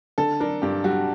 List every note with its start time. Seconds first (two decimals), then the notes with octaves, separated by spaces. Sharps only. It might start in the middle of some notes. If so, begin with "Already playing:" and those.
0.18 D3 A4
0.40 D4 A#4
0.62 G2 G4
0.84 G3 F#4